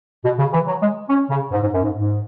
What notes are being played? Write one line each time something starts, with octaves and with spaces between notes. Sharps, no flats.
B2
C#3
E3
F#3
G#3
C#4
C#3
G#2
G#2
F#2
G#2
G#2